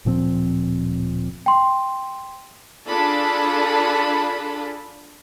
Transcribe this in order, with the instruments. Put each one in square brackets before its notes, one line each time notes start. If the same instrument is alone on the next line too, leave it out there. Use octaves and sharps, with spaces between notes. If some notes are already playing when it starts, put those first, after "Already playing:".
[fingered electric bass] D1 A#2 F3 C4
[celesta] G5 C6
[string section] D4 F4 G#4 A4 A5 B5